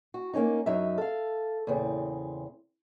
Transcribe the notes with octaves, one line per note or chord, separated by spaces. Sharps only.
F#4
A#3 C4 C#4 D#4
F#2 F#3 D#4 E5
A4 F5
E2 A#2 C#3 C4